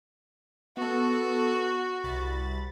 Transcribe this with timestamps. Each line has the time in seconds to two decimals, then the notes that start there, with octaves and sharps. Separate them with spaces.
0.77 B3 F#4 A4
2.04 C2 B5 A6